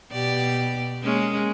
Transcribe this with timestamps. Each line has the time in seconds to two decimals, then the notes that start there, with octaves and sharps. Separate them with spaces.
0.12 B2 G4 D5
1.03 G#3 A#3 C#4